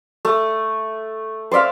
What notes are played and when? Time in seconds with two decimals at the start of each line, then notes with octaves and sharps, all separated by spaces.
0.25 A3
1.51 C5 D5 E5 F5